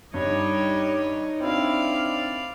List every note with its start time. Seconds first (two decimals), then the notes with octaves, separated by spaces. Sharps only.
0.14 G2 G3 D#4 C#5 D#5
1.40 C4 D4 E4 D5 F5